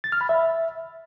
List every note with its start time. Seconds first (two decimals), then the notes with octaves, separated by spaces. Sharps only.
0.04 A6
0.12 F6
0.21 B5
0.29 E5